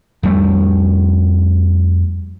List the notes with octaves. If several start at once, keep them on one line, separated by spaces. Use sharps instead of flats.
F2 G3 A3